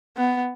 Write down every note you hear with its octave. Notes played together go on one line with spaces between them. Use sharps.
B3